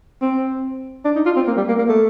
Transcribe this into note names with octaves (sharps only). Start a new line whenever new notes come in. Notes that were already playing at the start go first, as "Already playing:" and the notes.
C4
D4
D#4
F4
C4
A#3
G3
A#3
A#3
A3